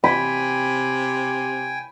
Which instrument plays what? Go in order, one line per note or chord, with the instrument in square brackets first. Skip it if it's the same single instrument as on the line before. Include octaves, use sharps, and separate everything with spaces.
[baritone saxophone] C3 [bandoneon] G5 G#5 [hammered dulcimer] B5